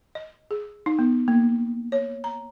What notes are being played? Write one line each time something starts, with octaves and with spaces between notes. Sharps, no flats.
D#5
G#4
D#4
B3
A#3
C#5
A#5